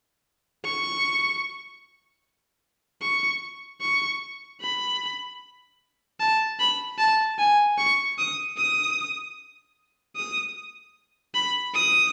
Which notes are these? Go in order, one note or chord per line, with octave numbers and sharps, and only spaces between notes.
C#6
C#6
C#6
B5
A5
B5
A5
G#5
C#6
D#6
D#6
D#6
B5
D#6